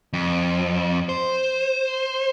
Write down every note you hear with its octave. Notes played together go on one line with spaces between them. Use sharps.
F2
C5